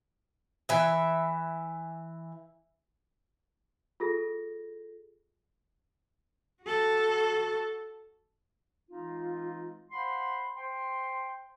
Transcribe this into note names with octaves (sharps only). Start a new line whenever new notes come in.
E3 E5
F4 G#4 A4 A#6
F#4 A4
E3 G#3 C4 D#4 F4
C5 F5 F#5 B5 C6
C5 G5 C6